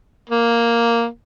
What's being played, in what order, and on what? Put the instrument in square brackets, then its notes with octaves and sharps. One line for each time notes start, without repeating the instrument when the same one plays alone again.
[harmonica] A#3